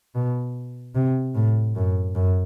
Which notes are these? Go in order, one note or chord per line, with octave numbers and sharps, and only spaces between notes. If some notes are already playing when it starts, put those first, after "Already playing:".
B2
C3
A2
F#2
F#2